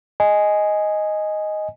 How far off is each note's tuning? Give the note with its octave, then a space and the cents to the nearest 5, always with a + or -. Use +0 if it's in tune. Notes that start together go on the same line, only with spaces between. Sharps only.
D#5 +0 G#5 +0